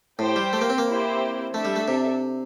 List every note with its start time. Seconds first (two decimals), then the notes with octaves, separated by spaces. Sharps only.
0.19 A2 G4 C5 G5
0.36 G3
0.53 A3
0.61 A#3
0.70 C4
0.78 A#3
0.87 C4 E4 G4 C5
1.54 A3 D4 A4 E5
1.65 G3
1.76 A3
1.88 C3